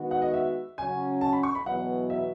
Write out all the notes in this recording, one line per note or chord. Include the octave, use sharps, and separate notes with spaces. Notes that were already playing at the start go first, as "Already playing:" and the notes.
Already playing: D#3 G#3 B3 F#4
F#5
D#5
E5
C#3 F#3 C#4 G#5
A5
B5
C#6
B5
E2 B2 F#3 F#5
E5